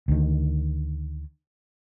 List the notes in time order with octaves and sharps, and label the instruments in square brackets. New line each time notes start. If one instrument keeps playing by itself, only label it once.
[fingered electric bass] D2 D#3